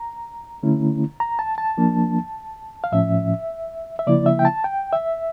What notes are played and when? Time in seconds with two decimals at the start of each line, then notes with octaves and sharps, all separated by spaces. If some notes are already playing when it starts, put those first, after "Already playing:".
Already playing: A#5
0.63 D3 A3 C#4 E4
1.20 A#5
1.39 A5
1.58 A5
1.77 F3 A#3 D4
2.84 F5
2.92 A2 F3 C#4 E5
3.99 E5
4.07 C#3 F3 A#3 E4 D5
4.26 E5
4.39 G5
4.45 A5
4.64 G5
4.93 E5